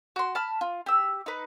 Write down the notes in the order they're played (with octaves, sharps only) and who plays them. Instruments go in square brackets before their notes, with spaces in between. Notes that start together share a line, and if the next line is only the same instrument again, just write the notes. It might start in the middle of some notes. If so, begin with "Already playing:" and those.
[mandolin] F#4 C6
A5 B5 F6
F4
G4 E6
D#4 B4